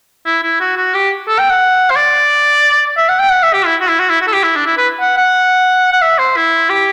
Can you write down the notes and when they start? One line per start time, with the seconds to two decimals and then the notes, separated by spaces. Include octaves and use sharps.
0.26 E4
0.43 E4
0.60 F#4
0.77 F#4
0.94 G4
1.28 A4
1.39 G5
1.50 F#5
1.90 C5
1.96 D5
2.97 E5
3.08 F#5
3.19 G5
3.30 F#5
3.43 E5
3.53 G4
3.65 E4
3.81 F#4
3.88 E4
3.99 F#4
4.10 E4
4.21 F#4
4.27 A4
4.33 G4
4.43 E4
4.56 D4
4.66 E4
4.77 B4
5.00 F#5
5.17 F#5
5.93 F#5
6.01 E5
6.18 C5
6.36 E4
6.70 G4